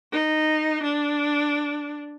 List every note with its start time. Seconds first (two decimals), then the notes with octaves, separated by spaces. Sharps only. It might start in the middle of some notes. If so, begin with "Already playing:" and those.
0.12 D#4
0.83 D4